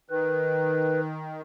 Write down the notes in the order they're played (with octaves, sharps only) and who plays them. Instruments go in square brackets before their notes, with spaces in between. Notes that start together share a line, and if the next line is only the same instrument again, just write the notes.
[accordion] D#3 [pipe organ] B4